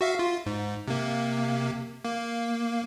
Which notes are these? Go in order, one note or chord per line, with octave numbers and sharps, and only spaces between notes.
F#4 E5 F5
F4
G#2
C3 A#3
A#3